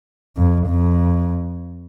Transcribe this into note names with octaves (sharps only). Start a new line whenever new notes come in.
F2
F2